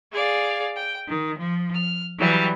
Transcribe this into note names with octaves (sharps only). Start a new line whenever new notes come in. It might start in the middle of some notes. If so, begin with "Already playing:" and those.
G#4 D5 F5
G5
D#3
F3
F6
E3 F#3 G3